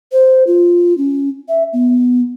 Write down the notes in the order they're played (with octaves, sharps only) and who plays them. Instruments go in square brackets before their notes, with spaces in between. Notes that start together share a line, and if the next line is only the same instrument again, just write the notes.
[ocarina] C5
F4
C#4
E5
B3